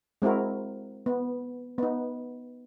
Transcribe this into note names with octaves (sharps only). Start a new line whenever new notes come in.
G#3 C4 E4 F#4 A#4
B3
B3 D#4